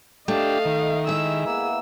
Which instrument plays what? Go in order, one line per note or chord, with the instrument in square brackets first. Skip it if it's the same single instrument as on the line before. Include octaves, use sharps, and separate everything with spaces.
[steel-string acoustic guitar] A3 [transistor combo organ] D4 G4 [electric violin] D#5 F5
[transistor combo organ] D#3 [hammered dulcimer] E5
[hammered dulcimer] G#3 E4 [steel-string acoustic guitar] G#4 E5 [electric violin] E6
[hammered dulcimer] A#3 B3 F#5 [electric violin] E6